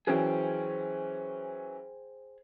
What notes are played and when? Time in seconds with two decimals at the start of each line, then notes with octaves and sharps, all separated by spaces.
0.07 E3 F#3 C#4 G#4 C5 G5